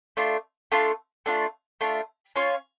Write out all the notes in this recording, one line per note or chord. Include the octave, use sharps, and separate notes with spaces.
A3 D4 F4
A3 D4 F4
A3 D4 F4
A3 D4 F4
C#4 F4 C#5